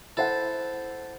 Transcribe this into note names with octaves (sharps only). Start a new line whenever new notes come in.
E4 A4 C5 F#5